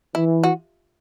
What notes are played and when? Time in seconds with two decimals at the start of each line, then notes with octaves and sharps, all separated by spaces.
0.15 E3 E4
0.43 F#4